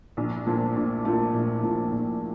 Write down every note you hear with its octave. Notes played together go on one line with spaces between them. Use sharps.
A#1
A#2 F3 A3
A#1
A#2 F3 A3
A#1
A#2 F3 A3
A#1